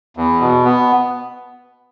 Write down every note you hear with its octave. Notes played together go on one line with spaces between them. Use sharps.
E2
B2
B3